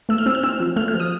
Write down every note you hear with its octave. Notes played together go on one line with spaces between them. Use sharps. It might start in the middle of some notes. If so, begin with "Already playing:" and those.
A3 E6
F6
C4 E6
F6
C4 E6
F3
A3 F6
F6
F3
D#6